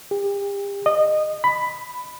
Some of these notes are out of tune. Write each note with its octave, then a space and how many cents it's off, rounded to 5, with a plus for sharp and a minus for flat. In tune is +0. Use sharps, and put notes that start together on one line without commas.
G4 +35
D#5 -20
B5 +10